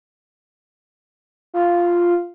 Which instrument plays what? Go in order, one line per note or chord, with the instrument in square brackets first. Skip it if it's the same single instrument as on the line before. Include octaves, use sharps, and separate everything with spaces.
[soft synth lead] F4